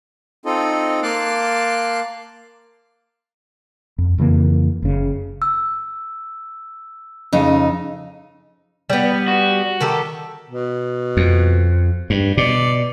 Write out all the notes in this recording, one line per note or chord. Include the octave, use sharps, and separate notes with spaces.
C4 D#4 F4 A4 D#5
A#3 F5 A5 C6 D6 F#6
F2
F2 C#3 E3 A#3
F#1 C#3
E6
F2 C#3 D#4
G3 B3
F#4
D#3 G4 A4
B2
F2
G2
B2 D5